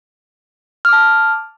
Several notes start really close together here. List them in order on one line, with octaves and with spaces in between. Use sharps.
F6 D6 A5